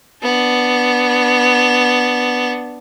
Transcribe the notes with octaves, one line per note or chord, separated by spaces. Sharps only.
B3 D4